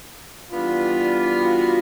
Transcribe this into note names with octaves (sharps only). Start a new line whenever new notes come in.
E3 G3 B3 D4 F4
F#4